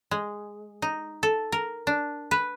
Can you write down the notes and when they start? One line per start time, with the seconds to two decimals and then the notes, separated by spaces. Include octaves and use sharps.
0.11 G#3
0.82 D#4
1.23 A4
1.52 A#4
1.87 D4
2.31 B4